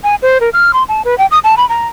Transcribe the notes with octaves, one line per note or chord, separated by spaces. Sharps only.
G#5
C5
A#4
F6
C6
A5
B4
G5
D#6
A5
B5
A#5